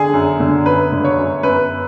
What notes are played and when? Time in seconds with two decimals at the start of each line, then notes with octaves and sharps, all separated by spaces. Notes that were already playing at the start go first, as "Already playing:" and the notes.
Already playing: D3 G#4
0.14 F#2
0.40 D3
0.66 F#2 B4
0.92 D3
1.05 C#5
1.18 F#2
1.43 F#2 B4